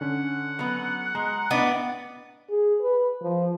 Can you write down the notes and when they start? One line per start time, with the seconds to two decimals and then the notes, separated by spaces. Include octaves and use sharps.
0.01 D3 C#4 F#5
0.59 F#3 B3
1.15 G#3 A#5
1.51 A2 B3 D4 D5 D#5
2.50 G#4
2.81 B4
3.22 F3